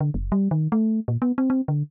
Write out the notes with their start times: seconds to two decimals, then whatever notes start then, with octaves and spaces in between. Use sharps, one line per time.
0.01 D3
0.14 F#1
0.32 G3
0.51 D#3
0.72 A3
1.08 A#2
1.22 B3
1.38 C4
1.50 C4
1.68 D3